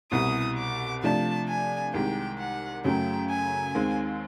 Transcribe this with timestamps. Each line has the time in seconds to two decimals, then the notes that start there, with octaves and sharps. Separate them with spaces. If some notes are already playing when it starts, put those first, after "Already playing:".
0.11 C2 B2 G3 C4 E4 D#6
0.58 D6
1.03 C3 F3 A3 D4 A5
1.48 G#5
1.93 C2 C3 D#3 G#3 G5
2.38 F#5
2.84 F#2 C#3 F#3 A3 G5
3.30 G#5
3.75 D#2 D#3 G#3 C4